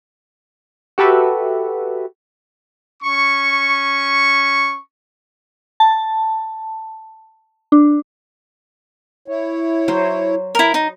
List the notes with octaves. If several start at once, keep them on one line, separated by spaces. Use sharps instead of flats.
F#4 G4 A4 B4 E5
C#4 C#6
A5
D4
E4 C#5
F#3 C5
E4 A#4
D#4